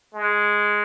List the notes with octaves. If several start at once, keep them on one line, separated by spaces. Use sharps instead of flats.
G#3